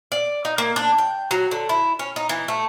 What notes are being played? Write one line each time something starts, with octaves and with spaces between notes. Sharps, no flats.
D5
D#4
A#3
D4
G5
F#3
D3
E4
C#4
D#4
E3
A3